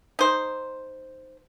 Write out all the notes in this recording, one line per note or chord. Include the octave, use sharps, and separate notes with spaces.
D#4 C5